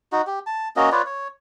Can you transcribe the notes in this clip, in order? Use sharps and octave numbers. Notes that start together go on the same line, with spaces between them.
D#4 F#4
G4
A5
A#3 C#4 F#4 D#5
F4 B4 C#5 D5
C#5